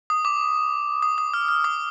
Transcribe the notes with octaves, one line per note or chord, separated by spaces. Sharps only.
D#6
D6
D#6
D#6
F6
F6
D#6